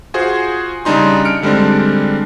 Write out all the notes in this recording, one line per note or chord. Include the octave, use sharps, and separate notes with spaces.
F4 F#4 G#4 C5
C#3 G3 D4 D#4 C6
F6 C#7 D7
D3 G3 G#3 C4 D4